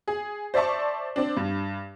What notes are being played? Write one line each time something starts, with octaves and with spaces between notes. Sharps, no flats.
G#4
C5 D5 E5 A5 C#6
C4 D4
G2